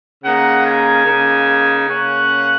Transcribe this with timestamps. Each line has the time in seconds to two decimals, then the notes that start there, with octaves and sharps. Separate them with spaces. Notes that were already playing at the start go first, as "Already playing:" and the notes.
0.24 C#3 A#3 D#4 F#5
0.65 G#5
1.06 C#3 A#3 D#4
1.88 C#3 A#3 C#4 F#5